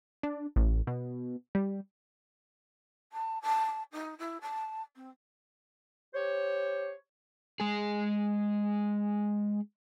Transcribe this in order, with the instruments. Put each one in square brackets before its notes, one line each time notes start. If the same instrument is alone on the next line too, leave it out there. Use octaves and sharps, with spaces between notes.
[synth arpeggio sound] D4
A1
B2
G3
[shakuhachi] A5
A5
D#4
E4
A5
C4
[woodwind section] G4 C5 C#5
[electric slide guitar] G#3 G#4